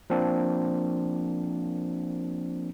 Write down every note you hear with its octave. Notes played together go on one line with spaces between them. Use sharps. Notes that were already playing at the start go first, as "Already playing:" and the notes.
F3 A#3 C4 D4